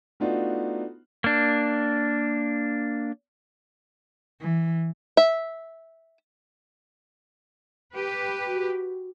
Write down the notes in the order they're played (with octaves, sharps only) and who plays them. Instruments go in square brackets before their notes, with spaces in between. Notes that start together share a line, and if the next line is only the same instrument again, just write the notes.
[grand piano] A3 B3 D4 D#4 F4 F#4
[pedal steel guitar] A#3 D4
[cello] E3
[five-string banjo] E5
[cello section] G4 B4
[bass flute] F#4